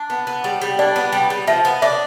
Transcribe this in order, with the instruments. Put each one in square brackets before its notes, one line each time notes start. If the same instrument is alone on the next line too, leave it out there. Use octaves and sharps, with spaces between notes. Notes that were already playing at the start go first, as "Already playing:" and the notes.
Already playing: [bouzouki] D4
B3
B3
G3
G3
[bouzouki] D4 [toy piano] D5
[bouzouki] B3
G3
G3
[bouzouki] F3 [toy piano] E5
[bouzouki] B3
[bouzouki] D4 [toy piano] E5